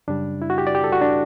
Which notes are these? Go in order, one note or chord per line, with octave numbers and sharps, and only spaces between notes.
F#2 C#3 G3 D4
E4
F#4
G4
D5
G4
A4
F#4
D4